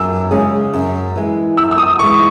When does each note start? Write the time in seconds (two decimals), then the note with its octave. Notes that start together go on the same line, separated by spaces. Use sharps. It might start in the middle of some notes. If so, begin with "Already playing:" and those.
Already playing: F#2 E6
0.31 C#3 G#3 C#4 G#4
0.73 F#2
1.16 E3 G#3
1.57 F#2 E6
1.71 E6
1.78 D#6
1.99 E3 G#3 C#6